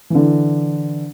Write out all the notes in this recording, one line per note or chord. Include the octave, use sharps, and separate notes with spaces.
D3 E3